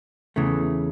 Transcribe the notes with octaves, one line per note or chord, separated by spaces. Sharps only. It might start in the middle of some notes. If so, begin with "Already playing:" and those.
E2 C#3 E3 A3